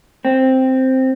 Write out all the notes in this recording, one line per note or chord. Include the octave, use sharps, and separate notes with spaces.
C4